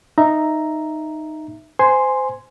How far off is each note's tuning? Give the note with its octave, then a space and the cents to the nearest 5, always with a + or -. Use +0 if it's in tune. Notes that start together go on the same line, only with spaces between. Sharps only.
D#4 -10 E5 +0 A#5 +0
C5 -20 G#5 +0 C6 +0